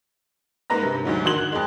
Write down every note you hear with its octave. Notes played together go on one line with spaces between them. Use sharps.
G#2 A#3 B4 A#5 A#6
G2 C3
D2 G#2 F#3
D3 D#3 F#4 C6 G#6 F#7
F#6
F2 G#3